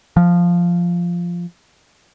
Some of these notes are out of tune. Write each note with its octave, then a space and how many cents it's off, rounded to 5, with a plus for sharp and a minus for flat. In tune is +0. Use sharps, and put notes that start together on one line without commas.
F3 -5